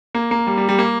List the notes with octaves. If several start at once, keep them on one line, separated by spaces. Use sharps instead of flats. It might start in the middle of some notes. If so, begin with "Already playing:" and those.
A#3
A#3
G3
G3
G3
A#3